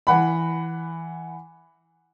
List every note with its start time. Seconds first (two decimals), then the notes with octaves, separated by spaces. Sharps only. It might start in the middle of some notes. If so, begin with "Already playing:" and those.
0.07 E3 F#5 B5